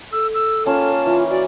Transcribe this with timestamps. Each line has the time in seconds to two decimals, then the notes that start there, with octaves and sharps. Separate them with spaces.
0.12 A4 E6
0.34 E6
0.66 A#3 C#4 F4 A5
1.06 E3 F4
1.30 F#4 D5